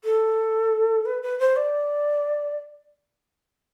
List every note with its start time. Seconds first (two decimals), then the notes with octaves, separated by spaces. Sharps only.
0.04 A4
1.05 B4
1.22 B4
1.39 C5
1.56 D5